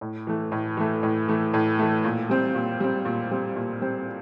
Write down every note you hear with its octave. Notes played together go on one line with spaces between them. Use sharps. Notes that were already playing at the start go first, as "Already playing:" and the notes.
A2
E3 A3
A2
E3 A3
A2
E3 A3
A2
E3 A3
A#2
G3 C4
A#2
G3 C4
A#2
G3 C4
A#2
G3 C4